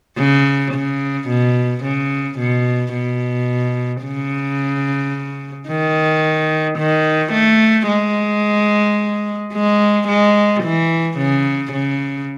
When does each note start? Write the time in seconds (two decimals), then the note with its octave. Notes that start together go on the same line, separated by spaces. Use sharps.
0.18 C#3
0.74 C#3
1.29 B2
1.84 C#3
2.39 B2
2.94 B2
4.03 C#3
5.69 D#3
6.78 D#3
7.33 A3
7.88 G#3
9.54 G#3
10.08 G#3
10.63 E3
11.18 C#3
11.73 C#3